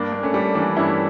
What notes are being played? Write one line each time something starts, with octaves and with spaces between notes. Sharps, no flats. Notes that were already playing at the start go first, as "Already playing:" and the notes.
Already playing: G2 A#3 D4
G2
A3 C#4
G3
E3 A#3 D4
G2 C#4 E4